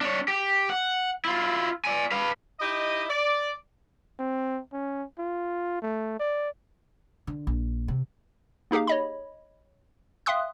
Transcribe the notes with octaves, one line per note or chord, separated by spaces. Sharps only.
D4 C#5
G4
F#5
E4 F4
D5 G#5
B4 F5
D#4 E4 G4 D#5
D5
C4
C#4
F4
A3
D5
D3
A#1
C3
A#3 D#4 G4 G#4 F5
C#5 D#5 B5
E5 F5 G5 C6 D#6 F#6